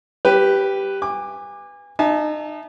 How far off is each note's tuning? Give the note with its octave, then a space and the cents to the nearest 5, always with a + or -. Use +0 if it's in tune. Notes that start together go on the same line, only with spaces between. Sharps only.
G3 +0 G4 +0 B4 +5
G#5 -30 D6 +15
D#4 -35 E5 +0 A5 -45